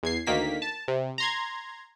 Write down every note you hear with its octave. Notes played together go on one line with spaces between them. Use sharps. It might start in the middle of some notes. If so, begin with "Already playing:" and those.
E2 G#6 C7
D2 D#3 A#3 B6
A5
C3
A#5 C6 G#6